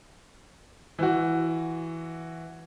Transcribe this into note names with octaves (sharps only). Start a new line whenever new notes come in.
E3 F#4